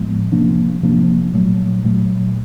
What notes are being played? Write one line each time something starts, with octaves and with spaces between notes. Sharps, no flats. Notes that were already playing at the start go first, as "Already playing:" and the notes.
Already playing: A2 F3 G#3 B3
C3 F3 A#3 D4
C3 F3 A#3 D4
A#2 F#3 A3
A#2 F#3 A3